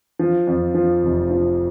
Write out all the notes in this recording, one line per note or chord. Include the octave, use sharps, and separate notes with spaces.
F3
F2
F3
F1
F3